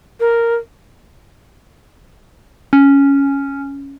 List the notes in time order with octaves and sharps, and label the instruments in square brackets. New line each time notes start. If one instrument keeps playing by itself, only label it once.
[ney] A#4
[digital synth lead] C#4